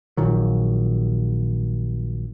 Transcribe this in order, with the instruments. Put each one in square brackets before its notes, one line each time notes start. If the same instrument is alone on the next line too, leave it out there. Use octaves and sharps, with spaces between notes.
[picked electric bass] A#1 A#2 D#3 F#3